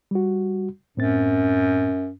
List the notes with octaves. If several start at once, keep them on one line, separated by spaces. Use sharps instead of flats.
G3 F#4
F#2 A2 C4 A6